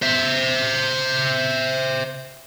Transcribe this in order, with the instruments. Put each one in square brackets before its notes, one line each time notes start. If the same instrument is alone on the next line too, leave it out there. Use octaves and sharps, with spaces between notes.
[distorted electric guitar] C5 E5